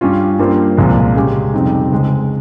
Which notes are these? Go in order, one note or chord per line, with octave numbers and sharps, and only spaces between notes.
G2 G3 C#4 F4
G2 G3 A#3 F4 C5
C2 A#2 F3 G#3
C#3 G#3 C#4 G4
F2 C3 G3 C4 D#4
C#2 C#3 G#3 C#4